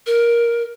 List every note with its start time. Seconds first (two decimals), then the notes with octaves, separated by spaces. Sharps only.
0.06 A#4